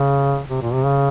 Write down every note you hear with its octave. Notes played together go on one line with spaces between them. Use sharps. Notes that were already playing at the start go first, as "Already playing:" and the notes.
Already playing: C#3
C3
A#2
C3
C#3